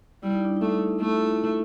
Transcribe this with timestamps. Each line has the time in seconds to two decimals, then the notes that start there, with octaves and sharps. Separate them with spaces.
0.23 G3 E4
0.34 D#4
0.45 D4
0.57 A3 D#4
1.01 A3 E4
1.13 F4
1.24 E4